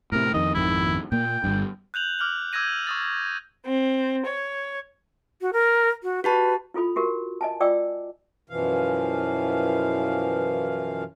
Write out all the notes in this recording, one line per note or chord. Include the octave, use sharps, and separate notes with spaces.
A2 C3 A#4
F2 D#3 D#5
G#1 F2 D#3 E4
A#2 A#3 G5
G1 G2
F#6 G6 F7 F#7
D6 F6 F#6 F#7
D6 E6 G6 G#6 A#6 D#7
C#6 D#6 A6
C4
C#5
F#4
A#4
F#4
F#4 G4 B4 A5
E4 F4 A4 B5
F#4 G4 A#4
D#5 G#5 A5
F4 D5 D#5 G5 D6 E6
F#2 B2 E3 F3 F5